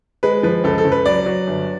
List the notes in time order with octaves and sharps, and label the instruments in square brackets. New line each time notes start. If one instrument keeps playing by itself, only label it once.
[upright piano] G#3 B4
F3 B4
C#2 A4
A4
C#2
B4
F#3 D5
F#3
G1